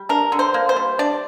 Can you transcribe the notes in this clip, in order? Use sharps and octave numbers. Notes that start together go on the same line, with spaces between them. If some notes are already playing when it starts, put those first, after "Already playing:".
Already playing: G3
D4 A#4
D3
C5
A#3
C5
G3
D4 D5